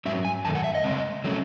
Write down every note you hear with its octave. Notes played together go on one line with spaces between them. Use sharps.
G#2 F#3 C#4 E5
G#5
F#2 D#3 A3 A5
F#5
E5
D#5
C#3 G#3 C4
F#3 A3 C#4